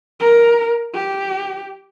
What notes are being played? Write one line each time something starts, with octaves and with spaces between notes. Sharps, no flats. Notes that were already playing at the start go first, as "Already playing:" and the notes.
A#4
G4